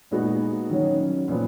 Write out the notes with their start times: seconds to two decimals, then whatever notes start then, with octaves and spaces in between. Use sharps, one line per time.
0.11 A#2 G#3 B3 D#4 F#4
0.70 D#3 F#3 C#4
1.28 A#2 F3 B3